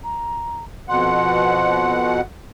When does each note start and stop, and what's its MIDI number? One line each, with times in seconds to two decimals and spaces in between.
0.03 0.64 82
0.89 2.21 41
0.89 2.21 47
0.89 2.21 78
0.89 2.12 84